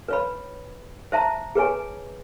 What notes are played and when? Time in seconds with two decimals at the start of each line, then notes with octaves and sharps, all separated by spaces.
0.08 B4 C#5 B5
1.12 C5 E5 A5 A#5
1.55 G#4 B4 C#5 G#5